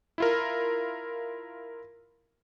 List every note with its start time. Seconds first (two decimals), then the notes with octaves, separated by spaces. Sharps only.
0.18 E4 F4 A#4